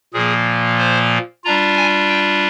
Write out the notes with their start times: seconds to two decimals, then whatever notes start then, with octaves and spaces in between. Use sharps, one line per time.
0.13 A#2 F3 A#3 G#4
0.79 C5
1.44 G3 D4 F4 A#5
1.77 G#5
2.10 G5